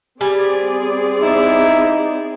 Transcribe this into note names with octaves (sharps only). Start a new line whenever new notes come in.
G3 C4 G#4 D5 G#5
D#4 E4